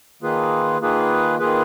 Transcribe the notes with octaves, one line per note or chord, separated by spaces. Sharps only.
D#3 A#3 F4 G#4 B4
D#3 A#3 F4 G#4 B4
D#3 A#3 F4 G#4 B4